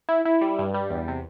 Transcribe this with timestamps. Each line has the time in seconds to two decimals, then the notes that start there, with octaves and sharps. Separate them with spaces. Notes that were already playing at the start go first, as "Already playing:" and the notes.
0.09 E4
0.25 E4
0.41 G3
0.59 G2
0.74 G3
0.90 E2
1.08 C3